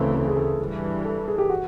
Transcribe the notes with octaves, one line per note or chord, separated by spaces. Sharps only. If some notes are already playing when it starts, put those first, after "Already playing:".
Already playing: D2 C#3 E3 A3 C4 A4
A4
G#4
A4
G2 E3 G3
A4
G#4
G4
F#4